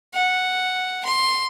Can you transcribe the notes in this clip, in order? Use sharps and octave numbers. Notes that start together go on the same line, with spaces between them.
F#5
C6